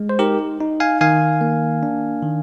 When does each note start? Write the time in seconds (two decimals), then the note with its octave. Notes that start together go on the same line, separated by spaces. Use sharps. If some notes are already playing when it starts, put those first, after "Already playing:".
Already playing: G#3
0.09 C5
0.19 D#4 G4 A#4
0.60 D#4
0.80 F5 G#5
1.01 D#3 F5 G#5
1.41 A#3
1.83 D4
2.23 D#3